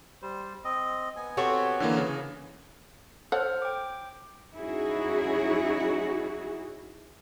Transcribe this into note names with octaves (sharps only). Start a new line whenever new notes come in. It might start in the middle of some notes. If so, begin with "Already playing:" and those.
G3 C5
C4 D#5
B3 G#5
C4 F#4 G4 A4 C#5
D3 E3 A#3
C#3
A4 C5 C#5 F#5 F6
G5 D6
F#3 C#4 D#4 E4 F#4 G#4